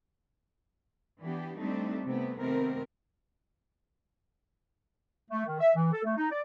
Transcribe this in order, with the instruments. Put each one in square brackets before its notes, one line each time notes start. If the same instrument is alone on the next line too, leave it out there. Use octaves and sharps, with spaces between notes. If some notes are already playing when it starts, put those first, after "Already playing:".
[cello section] E3 B3 D4 G4
G3 A3 C4 D4 D#4
C3 A3 B3
C3 D#3 A3 B3 C4 A#4
[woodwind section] A3
D#3
E5
E3
A4
A3
D#4
D5